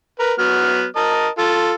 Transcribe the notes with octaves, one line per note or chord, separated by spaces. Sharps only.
A#4 B4
F#3 B3 F6
A#4 D#5 A5
F4 A4